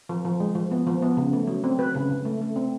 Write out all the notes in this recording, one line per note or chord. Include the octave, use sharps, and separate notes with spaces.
F3
F3
G#3
F3
B3
F3
B3
C#3
A3
F#3
C4
F#3 B4
C#3
C#3
A3
A3
C4